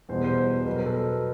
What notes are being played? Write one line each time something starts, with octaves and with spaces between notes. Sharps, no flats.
E2 B2 G3 C5
C5
B2 F#3 B4
A#4
A4